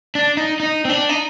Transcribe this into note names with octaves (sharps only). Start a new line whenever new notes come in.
D4
D#4
D#4
C4
D4
D#4